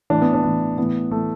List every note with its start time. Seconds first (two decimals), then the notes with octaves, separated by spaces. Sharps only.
0.10 A2 E3 D4
0.22 B3
0.34 D4
0.44 A2 E3
0.78 A2 E3 B3
1.11 A2 E3 A3